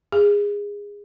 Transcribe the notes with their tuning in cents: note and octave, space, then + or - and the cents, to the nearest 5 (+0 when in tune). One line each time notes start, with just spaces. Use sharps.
G#4 -20